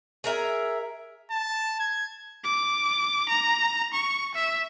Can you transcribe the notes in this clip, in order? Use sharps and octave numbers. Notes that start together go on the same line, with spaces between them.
G#4 A#4 E5
A5
G#6
D6
A#5
C#6
E5